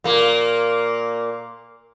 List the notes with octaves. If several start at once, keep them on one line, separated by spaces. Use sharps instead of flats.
A#2 A#3